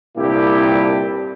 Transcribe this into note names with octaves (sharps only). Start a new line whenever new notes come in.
C2 G2 A#2 E4 G4